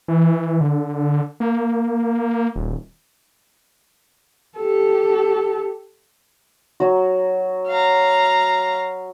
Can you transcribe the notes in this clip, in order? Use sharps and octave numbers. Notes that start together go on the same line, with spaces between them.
E3
D3
A#3
D#1
G4 A4
F#3 F#4
F5 A#5